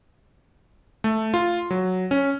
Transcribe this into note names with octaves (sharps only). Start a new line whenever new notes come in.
A3
F4
F#3
C#4